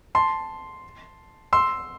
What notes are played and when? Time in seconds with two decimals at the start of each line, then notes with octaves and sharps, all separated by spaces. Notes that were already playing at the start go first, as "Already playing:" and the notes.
0.15 A5 C6
1.53 C6 E6